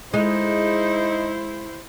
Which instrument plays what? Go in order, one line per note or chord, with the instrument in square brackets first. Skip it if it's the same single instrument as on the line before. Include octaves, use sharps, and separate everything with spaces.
[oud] G#3 [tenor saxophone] D#4 [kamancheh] E4 C5